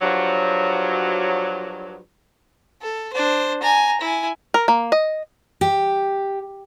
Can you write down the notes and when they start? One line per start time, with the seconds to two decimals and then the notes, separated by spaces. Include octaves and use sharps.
0.01 G2 F3 F#3
2.81 A4
3.13 D4 C5
3.63 G#5 A#5
4.01 E4 G#5
4.54 A#4
4.68 A#3
4.92 D#5
5.61 G4